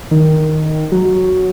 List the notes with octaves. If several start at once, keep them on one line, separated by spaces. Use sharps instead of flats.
D#3
F#3